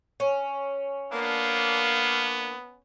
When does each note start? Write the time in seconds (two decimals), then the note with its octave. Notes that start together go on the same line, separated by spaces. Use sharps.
0.20 C#4
1.12 A#3 B3 D4 F5